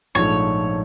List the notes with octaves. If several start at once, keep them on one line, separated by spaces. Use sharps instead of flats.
A#1 G#2 F3 A3 C#5